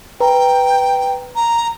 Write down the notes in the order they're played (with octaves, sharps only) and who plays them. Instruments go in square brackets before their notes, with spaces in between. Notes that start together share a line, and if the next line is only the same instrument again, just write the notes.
[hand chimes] B4 A#5 [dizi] G5
[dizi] A#5